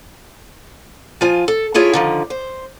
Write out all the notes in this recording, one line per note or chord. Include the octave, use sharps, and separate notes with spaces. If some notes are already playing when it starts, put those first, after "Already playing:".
F3 F4 G#5
A4
A3 E4 F4 G#4 C#5
D3 D#3 F3
C5